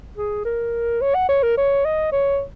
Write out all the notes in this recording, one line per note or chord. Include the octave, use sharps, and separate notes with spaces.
G#4
A#4
C#5
F#5
C#5
A#4
C#5
D#5
C#5